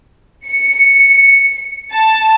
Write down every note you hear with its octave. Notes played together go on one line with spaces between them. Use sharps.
C#7
A5